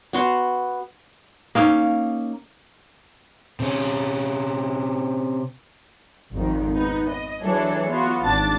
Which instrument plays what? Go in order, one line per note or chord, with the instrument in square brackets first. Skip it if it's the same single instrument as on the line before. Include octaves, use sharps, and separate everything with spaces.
[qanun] B3 F#4 C6
[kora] A#3 C#4 D#4
[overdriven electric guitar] C3 C#4
[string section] G#1 F2 D#3
B3 D#4
D#5
E3 F#3 D4 G#4 A4
B3 F4 F#4
G#1 D4 A5 A6